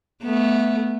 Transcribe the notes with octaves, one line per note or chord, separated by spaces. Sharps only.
A3 B3